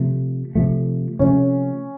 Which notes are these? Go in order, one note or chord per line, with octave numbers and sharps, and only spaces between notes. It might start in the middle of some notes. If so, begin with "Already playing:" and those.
Already playing: C3 F3 A3
C3 F3 A3
C3 F3 A3 C#4